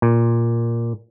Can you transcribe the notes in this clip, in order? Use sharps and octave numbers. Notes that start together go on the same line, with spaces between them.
A#2